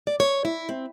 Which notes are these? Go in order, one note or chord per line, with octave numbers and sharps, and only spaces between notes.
D5
C#5
E4
C4